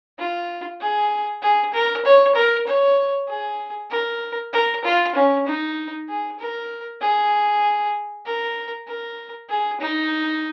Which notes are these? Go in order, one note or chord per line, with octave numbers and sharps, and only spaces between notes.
F4
G#4
G#4
A#4
C#5
A#4
C#5
G#4
A#4
A#4
F4
C#4
D#4
G#4
A#4
G#4
A#4
A#4
G#4
D#4